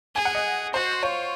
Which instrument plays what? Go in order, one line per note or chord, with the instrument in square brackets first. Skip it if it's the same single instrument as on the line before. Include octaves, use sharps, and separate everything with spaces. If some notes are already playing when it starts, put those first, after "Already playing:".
[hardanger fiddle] G#4 [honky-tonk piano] G#5
[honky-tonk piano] F#5
D#5
[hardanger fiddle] F#4 [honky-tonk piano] C5
[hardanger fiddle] F4 [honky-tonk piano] C#5